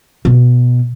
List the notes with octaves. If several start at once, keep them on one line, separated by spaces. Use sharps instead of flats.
B2